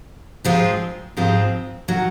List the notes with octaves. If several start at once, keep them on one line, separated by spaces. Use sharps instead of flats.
G#2 F3 G#3 C4 F4
G#2 F3 G#3 C4 F4
D#3 F#3